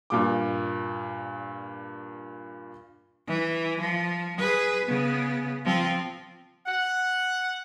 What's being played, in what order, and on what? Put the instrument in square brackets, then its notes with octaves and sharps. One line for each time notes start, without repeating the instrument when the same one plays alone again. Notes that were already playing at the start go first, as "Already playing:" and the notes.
[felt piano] G2 A#2 D6
[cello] E3
F3
G#4 B4
C#3 B3
F3 C4
[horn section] F#5